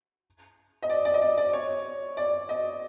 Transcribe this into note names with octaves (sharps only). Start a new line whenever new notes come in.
D#5
D5
D5
D#5
D5
D5
C#5
D5
D#5